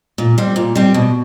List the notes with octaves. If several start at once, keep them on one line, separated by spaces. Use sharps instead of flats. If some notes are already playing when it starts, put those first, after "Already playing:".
A#2
G3 C4
A#2
G3 C4
B2